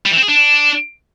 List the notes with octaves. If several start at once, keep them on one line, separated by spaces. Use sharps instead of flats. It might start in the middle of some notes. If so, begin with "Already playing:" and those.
G3
E3
C4
G#4
D4